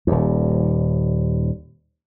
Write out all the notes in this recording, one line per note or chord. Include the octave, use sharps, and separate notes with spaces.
D#1 D#2